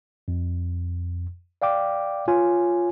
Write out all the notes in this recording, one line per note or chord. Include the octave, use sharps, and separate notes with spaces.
F2
D5 F5 G5 D6
F4 C#5 G#5